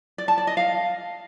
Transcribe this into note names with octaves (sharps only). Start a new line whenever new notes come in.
D5
A5
D5
D#5
F5